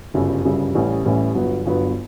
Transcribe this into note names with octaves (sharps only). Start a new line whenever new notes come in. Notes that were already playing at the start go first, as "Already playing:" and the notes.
G1 F#2 C#3 G3
G1 F#2 C#3 G3
A1 A2 E3 G3 C#4
A1 A2 E3 G3 C#4
G1 G2 F#3 B3
G1 G2 F#3 B3